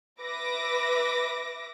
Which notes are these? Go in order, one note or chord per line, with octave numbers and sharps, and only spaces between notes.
B4 E5 D6 A#6